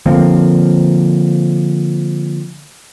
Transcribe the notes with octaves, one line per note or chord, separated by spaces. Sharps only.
D3 F3 A#3 C4